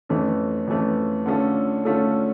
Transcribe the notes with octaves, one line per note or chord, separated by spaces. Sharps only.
F2 E3 A3 C#4
F2 E3 A3 C#4
D3 A3 C#4 F4 A4
D3 A3 C#4 F4 A4